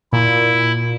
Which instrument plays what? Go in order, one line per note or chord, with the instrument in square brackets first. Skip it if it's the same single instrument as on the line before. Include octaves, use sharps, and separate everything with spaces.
[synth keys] A#2 [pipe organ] E4